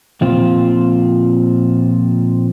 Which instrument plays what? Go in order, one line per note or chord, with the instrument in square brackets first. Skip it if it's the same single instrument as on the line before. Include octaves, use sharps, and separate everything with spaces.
[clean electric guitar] A#2 F3 C4 F4